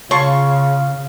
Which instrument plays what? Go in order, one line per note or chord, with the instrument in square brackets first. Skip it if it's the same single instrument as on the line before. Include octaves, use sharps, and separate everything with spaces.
[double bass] C#3 [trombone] F4 [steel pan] C#5 A5 C6 [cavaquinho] C#6